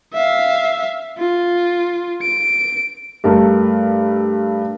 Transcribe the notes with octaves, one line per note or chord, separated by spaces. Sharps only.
E5 F5
F4
D7
G2 A3 A4 A#4